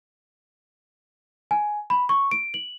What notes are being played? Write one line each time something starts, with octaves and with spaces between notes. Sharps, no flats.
G#5
B5
C#6
D7
F#7